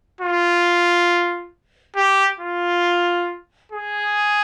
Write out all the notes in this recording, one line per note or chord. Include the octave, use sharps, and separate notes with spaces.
F4
G4
F4
G#4